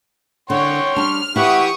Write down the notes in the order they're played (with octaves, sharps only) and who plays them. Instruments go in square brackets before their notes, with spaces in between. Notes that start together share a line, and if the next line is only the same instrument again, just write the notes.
[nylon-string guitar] D3 [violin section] C#5 F#5 [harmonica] G5 C6 C#6
[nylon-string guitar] G3 D4 [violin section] F6
[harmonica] E3 G4 [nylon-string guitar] E4 F#5 [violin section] C#6 D#6